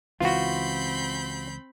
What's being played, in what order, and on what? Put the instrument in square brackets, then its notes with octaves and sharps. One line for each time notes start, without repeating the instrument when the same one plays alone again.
[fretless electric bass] C#2 E3 [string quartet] C4 B5 G6 [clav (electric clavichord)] F4 F#4